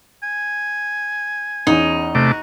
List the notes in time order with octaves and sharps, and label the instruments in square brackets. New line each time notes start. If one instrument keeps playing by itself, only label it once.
[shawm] G#5
[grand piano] E2 C#4 [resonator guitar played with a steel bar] D#4
[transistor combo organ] C3 A3 D6 [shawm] F#4